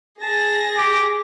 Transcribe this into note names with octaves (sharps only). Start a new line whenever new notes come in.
G#4 A5 A#6
G4 D6